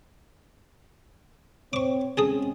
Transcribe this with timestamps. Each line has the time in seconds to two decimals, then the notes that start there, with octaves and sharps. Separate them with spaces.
1.73 C4 C5 C#5 C#6 D6
2.17 G#3 C4 C#4 G#4 A4 D#6